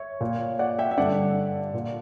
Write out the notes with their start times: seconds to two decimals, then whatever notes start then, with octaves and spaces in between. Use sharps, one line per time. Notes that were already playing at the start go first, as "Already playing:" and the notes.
Already playing: C#5 E5
0.21 A#2
0.59 D5 F#5
0.79 E5 G5
0.91 E5
0.97 G2 D3 D5 F#5
1.74 A#2